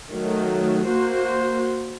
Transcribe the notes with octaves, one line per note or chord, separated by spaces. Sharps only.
D#3 F#3 A3
A#3 F#4 C5